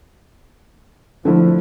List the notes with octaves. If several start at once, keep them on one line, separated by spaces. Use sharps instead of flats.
D3 F3 A3 E4